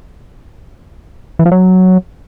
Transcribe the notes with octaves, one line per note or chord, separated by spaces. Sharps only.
E3
F3
F#3